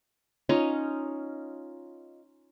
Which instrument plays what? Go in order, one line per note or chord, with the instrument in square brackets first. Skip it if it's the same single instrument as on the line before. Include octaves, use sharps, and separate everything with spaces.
[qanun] C#4 D#4 F4